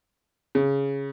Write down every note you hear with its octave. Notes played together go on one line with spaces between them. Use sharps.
C#3